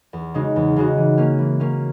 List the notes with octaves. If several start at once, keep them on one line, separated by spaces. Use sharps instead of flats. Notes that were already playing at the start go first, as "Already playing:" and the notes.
E2
C#3 G#3 D#4 F#4
E2
C#3 G#3 D#4 F#4
E3
A#3 C#4
E3
A#3 C#4